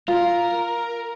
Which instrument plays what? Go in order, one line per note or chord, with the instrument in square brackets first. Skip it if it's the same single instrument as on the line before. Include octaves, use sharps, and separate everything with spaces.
[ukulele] F4 [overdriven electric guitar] A#4